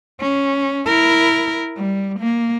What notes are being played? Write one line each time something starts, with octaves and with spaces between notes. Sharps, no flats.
C#4
E4 A#4
G3
A#3